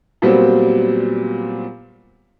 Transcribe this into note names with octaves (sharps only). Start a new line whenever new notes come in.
A#2 F#3 G3 B3 C4